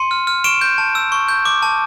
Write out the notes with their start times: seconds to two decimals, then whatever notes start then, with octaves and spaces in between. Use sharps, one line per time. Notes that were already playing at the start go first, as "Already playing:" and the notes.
Already playing: C6 C#7 D#7
0.11 F6
0.27 F6
0.44 C#6 D7 E7
0.61 G6
0.78 A5
0.95 E6
1.12 C#6
1.28 G6
1.45 D6
1.63 A5